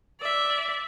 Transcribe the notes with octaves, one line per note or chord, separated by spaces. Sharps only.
D5 E5